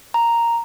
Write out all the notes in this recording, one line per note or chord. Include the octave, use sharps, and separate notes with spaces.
A#5